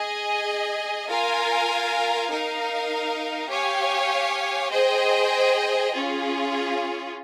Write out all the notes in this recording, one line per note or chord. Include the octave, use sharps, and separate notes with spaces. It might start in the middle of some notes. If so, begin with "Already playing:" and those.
Already playing: G#4 D#5 G#5
F4 A#4 F5 G#5
D#4 A#4 F5
G4 C#5 F5 G#5
G#4 C5 D#5 G5
C#4 F4 G#4